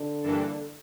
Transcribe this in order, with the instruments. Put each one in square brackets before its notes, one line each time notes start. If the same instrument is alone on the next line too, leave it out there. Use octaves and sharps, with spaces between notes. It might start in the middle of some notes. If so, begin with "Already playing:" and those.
Already playing: [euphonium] D3
[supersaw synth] G2 E3 A#3 D4 A4